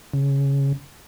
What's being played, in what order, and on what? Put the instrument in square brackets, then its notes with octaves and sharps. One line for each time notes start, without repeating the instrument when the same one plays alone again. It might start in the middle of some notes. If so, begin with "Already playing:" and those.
[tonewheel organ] C#3